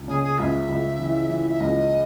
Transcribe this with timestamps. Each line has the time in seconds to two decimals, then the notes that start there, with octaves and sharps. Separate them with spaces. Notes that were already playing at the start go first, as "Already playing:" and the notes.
Already playing: C#2
0.08 C#3 G#4
0.23 G#4
0.38 C#2 E5
0.69 C#2
0.99 E3
1.29 E3
1.50 E5
1.60 C#2 D#5